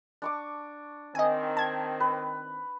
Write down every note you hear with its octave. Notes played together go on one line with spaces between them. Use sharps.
D4 C#6 D6
D#3 C4 D#5 G#5
A5 G#6
B4